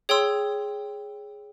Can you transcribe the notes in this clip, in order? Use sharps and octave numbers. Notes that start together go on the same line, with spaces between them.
G#4 C#5 G5 C6 E6